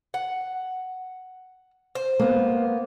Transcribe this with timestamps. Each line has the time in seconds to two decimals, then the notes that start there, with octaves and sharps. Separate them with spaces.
0.14 F#5
1.95 C5
2.19 A#3 B3